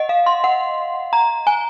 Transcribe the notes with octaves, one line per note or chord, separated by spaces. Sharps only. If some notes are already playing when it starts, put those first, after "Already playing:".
Already playing: D#5 F#5
F5
C6
F#5
A#5
G#5